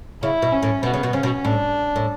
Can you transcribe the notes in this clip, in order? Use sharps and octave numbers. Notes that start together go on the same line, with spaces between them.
C#3 E4
B2
C#4
A2
B2 B3
C#3
B2
C#3 C#4
B2
A2 D4
A2